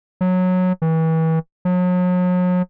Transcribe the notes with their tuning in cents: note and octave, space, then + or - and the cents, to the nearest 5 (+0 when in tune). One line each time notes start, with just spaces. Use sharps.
F#3 -15
E3 -35
F#3 -40